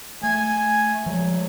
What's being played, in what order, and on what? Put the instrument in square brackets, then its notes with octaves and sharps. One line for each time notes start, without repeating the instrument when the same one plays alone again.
[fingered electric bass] A3 [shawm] G#5
[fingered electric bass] F3 G#3